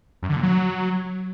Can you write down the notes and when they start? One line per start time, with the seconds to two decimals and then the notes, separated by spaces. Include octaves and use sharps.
0.23 F#2
0.29 D3
0.36 A#2
0.43 F#3